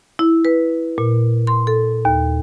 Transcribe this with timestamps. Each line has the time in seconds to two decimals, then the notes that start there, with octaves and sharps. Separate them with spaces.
0.19 E4
0.45 B4
0.98 A#2
1.47 C6
1.67 A4
2.05 D#2